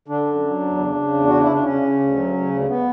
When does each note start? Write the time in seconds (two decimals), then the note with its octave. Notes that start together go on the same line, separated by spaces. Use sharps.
0.08 D3 D4
0.26 F#2
0.43 F#3
0.61 E2
0.78 C#3
0.95 C#3
1.13 E2
1.27 C#3 F#4
1.40 E4
1.47 C#3 D4
1.64 C#3 C#4
1.82 C#3
2.00 D2
2.16 F#3
2.33 C#3
2.50 D2
2.68 B3